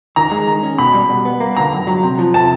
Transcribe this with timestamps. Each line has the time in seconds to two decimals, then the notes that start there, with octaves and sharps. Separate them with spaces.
0.16 D#3 A#5
0.32 G#3
0.47 D#3
0.63 C#4
0.78 B2 B5
0.94 G3
1.09 B2
1.25 B3
1.40 A#3
1.57 D3 A#5
1.73 F#2
1.87 F#3
2.03 C3
2.19 F3
2.34 C3 A5